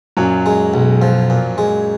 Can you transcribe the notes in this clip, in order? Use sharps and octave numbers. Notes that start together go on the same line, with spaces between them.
F#2 A#2 F#3
G#3
B1
F3
A#2
G#3